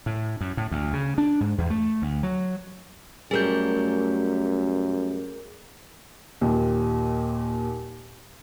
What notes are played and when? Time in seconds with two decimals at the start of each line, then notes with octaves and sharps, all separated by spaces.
0.06 A2
0.41 F#2
0.57 A2
0.71 D2
0.93 C#3
1.18 D4
1.41 G#2
1.58 E2
1.70 A3
2.02 D2
2.23 F#3
3.31 F#2 G3 A3 G#4 A#4 G6
6.41 D#2 A#2